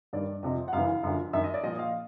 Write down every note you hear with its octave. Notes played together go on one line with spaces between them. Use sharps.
G2 D#3 D5
F2 C3 F3 D#5
F#5
F#2 C#3 E3 F5
F#2 D3 F3
F#2 D#3 E5
D#5
D5
A#2 F3 D#5
F5